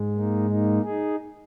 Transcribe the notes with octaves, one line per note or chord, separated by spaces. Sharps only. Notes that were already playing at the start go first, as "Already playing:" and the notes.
Already playing: G#2 G#3
A#3 D#4
A#3 D#4
D#4 G#4